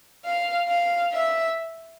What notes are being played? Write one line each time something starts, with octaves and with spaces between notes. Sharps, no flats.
F5
F5
E5